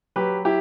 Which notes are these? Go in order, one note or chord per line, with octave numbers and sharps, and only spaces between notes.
F#3 G4 B4
E4 G4